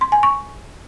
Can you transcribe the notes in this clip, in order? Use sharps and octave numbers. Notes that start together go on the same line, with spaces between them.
C6
G#5
C#6